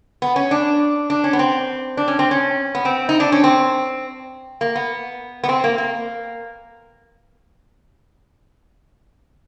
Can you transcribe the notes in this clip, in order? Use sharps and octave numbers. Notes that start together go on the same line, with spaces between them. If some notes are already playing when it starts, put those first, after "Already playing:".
B3
C#4
D4
D4
C#4
B3
C4
D4
C#4
C4
C#4
B3
C4
D#4
D4
C#4
C4
A#3
B3
B3
C4
A#3
A#3